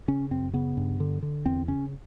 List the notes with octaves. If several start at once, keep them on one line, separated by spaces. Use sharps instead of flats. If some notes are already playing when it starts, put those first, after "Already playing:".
C#3 C#4
F#2 C4
C#3 B3
G2
D3
D3
E2 C4
C#3 C#4